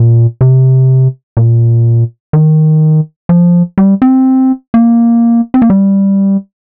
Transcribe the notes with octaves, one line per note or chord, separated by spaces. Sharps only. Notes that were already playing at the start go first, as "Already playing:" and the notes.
Already playing: A#2
C3
A#2
D#3
F3
G3
C4
A#3
C4
A#3
G3